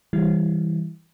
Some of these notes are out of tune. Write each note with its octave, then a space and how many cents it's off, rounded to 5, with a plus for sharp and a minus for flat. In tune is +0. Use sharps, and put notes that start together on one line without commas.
E3 -20 G3 +5 E4 +0